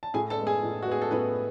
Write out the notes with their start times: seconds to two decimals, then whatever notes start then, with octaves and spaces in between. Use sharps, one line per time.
0.03 A5
0.14 A2 G#4 G#5
0.30 A4 A5
0.39 G#3 B3
0.47 G#4 G#5
0.63 A2
0.83 F#4
0.87 G#3 B3 G#4
1.02 A4
1.11 A2 B3 B4